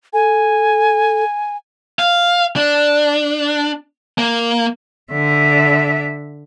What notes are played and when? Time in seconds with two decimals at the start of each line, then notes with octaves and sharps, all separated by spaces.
0.13 A4 G#5
1.99 F5
2.56 D4
4.18 A#3
5.12 D3 E5